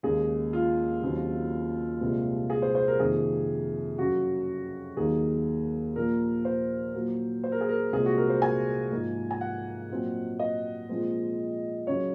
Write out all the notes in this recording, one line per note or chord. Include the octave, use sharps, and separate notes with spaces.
D#2 C#3 G#3 G#4
F4
D#2 C#3 F#3 C4
C2 A#2 G#3 C4
G#4
C5
C5
A#4
F2 C3 D#3 A#3 G#4
F#2 C#3 F#3 F#4
D#2 D#3 F#3 A#3 G#4
A#2 F3 A#3 A#4
C5
A#2 F#3 A#3
C5
A#4
G#4
A#4
C2 A#2 G#3 C4 G#4
F#4
A#4
C5
G#5
G#2 F3 A#3
G#5
F#5
A#2 F#3 C4
D#5
A#2 F3 G#3 C4
F#2 C#3 F#3 C#5